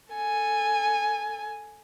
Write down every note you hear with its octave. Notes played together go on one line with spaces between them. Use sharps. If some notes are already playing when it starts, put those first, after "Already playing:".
A4 G#5